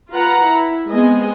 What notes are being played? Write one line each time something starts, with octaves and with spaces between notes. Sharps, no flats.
F4 B4 F#5 A#5
E4
G#3 B3 C4 D#5 G#5